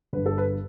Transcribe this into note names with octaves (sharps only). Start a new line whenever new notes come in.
G1 G2 D3 B4
A4
B4